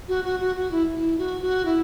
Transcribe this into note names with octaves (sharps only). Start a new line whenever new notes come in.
F#4
F#4
F#4
F#4
E4
E4
F#4
F#4
E4